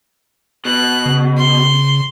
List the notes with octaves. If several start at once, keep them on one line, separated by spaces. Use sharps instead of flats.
B2 F#6
C#3
C6